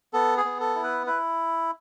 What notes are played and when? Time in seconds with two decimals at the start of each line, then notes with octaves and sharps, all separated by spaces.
0.13 B3 A4
0.37 G#4
0.45 B3
0.60 A4
0.75 E4
0.84 B4
1.06 E4 B4